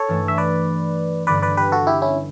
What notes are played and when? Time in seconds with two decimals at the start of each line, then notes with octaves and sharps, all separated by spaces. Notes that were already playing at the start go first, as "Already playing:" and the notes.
Already playing: A4 C#5
0.08 G2 E3 A3
0.28 E5
0.38 B4 D5
1.27 G1 G2 D3 G3 B4 D5
1.42 B4 D5
1.57 G4 B4
1.72 F#4 A4
1.87 E4 G4
2.02 C#4 E4